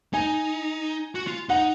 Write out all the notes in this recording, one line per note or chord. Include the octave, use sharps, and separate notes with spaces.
D#4 G#5
F#4
F4
D#4 F#5